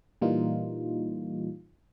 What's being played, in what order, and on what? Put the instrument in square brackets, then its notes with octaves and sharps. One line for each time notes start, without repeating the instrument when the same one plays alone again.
[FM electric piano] A#2 E3 G3 A#3 D#4 F4